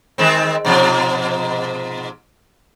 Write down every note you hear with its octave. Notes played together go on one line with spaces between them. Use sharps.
D#3 G#3 C4
G#2 B2 F3